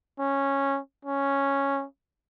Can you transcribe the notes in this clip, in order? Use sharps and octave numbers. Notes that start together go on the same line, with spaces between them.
C#4
C#4